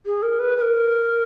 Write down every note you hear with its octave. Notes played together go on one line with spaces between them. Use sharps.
G#4
A#4
B4
B4
A#4